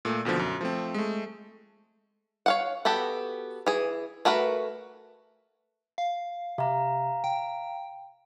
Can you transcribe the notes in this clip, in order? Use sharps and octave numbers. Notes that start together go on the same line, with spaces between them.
A#2 A3
D#2 B2 D3 F3
F#2
F3 A3 C4
G#3 A3
C#5 F5 F#5
B3 F#4 G4 A4
E3 G#4
A3 F#4 A#4 B4
F5
C3 F5 A#5
G5